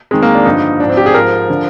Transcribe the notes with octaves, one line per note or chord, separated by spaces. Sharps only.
F2 D#3 G#3
A#3
D4
G2 D3 F3 D#4
G#2 F3 D4
C4
G4
G#4
G#2 F3 A#4
D3 F3